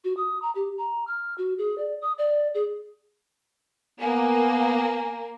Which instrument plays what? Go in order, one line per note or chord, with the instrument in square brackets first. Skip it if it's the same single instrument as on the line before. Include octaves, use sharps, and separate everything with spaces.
[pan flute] F#4
D#6
A#5
G4
A#5
F6
F#4
G#4
D5
D#6
D5
G#4
[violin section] A#3 [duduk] B3 [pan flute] G#5